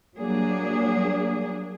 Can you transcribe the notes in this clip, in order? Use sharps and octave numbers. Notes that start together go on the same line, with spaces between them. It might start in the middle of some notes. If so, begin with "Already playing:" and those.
F#3 G3 A#3 D4 G#4